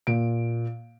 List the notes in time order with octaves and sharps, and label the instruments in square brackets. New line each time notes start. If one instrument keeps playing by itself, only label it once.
[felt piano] A#2 D7